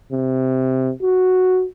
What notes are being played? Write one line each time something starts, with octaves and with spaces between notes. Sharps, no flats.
C3
F#4